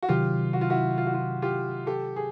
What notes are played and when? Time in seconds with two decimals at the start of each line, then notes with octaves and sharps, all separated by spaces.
0.03 F#4
0.09 C3 D#3 F#3 F4 G4
0.53 F#4
0.61 F4
0.70 E4 F#4
0.98 F4
1.07 F#4
1.14 F4
1.42 F4 G4
1.86 G4 A4
2.16 G#4